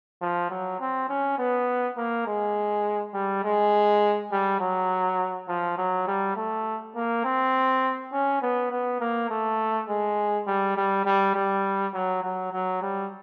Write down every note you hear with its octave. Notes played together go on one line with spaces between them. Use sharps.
F3
F#3
C4
C#4
B3
A#3
G#3
G3
G#3
G3
F#3
F3
F#3
G3
A3
A#3
C4
C#4
B3
B3
A#3
A3
G#3
G3
G3
G3
G3
F#3
F#3
F#3
G3